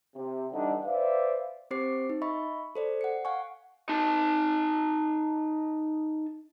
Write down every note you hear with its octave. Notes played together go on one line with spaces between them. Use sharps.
C3
D3 E3 G3 D4 D#4 A4
B4 C5 D5 E5 F5
C4 G4 C5 D6 C7
D#4
D#5 E5 B5 C#6
A4 C5 D5
F#5 C#7
F5 F#5 G#5 C#6
D#4 A5